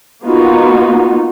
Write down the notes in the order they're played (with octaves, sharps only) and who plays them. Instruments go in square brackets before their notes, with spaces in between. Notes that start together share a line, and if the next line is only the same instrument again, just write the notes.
[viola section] A#3 B3 D#4 F4 F#4